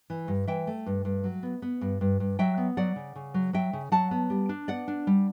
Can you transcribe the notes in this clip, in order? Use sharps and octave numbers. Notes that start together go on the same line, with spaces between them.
E3
G2
E3 E5 G5
A3
G2
G2
F#3
B3
B3
G2
G2
G2
F#3 E5 G5
B3
F#3 D5 F#5
C#3
C#3
F#3
F#3 E5 G5
C#3
F#3 F#5 A5
B3
G3
D4
B3 D5 F#5
D4
G3